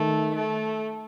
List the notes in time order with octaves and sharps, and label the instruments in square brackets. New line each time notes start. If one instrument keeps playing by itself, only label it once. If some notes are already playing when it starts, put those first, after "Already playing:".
Already playing: [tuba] D#3 [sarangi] A3
[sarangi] A3